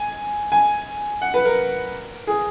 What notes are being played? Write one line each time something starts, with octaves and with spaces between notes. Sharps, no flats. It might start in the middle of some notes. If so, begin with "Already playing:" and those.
Already playing: G#5
G#5
F#5
B4
A#4
G#4